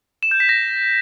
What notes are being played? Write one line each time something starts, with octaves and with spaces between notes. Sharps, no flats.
E7
G6
B6
A#6